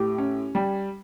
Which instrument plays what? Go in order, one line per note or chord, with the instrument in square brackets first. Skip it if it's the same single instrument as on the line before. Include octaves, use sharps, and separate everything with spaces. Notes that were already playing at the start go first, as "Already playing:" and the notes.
Already playing: [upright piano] A2 [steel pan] G4
[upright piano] C#4
G3